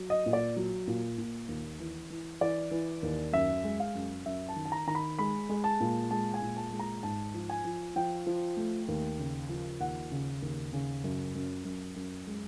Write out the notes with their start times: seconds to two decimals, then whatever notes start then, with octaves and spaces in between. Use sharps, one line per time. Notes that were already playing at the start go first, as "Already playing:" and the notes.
Already playing: F#3
0.10 D#5
0.26 A#2
0.33 D5
0.56 F#3
0.88 A#2
1.18 A#2
1.48 D#2
1.79 E3
2.10 E3
2.41 E3 D5
2.71 E3
3.03 D#2
3.33 F#2 E5
3.64 G#3
3.80 F5
3.95 F#2
4.26 F#2 E5
4.49 A5
4.56 D#3
4.65 A5
4.72 A#5
4.87 D#3 A#5
4.95 B5
5.19 G#3 B5
5.49 G#3
5.64 A5
5.80 A#2
6.11 G#3 A5
6.34 G#5
6.42 A#2
6.57 A5
6.72 G#3
6.79 A#5
7.03 G#2 A5
7.34 F3
7.50 G#5
7.64 F3
7.96 F3 G5
8.27 F3
8.57 A3
8.88 D#2
9.19 C#3
9.49 F3
9.80 D#2 F#5
10.11 C#3
10.42 D#2
10.73 C#3
11.04 F#2
11.35 F#2
11.65 F#2
11.96 F#2
12.27 G#3